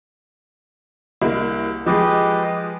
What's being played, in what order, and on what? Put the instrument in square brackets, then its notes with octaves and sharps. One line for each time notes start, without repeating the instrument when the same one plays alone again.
[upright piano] C2 A#3
[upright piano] F3 G#3 [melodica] G4 B4 D#5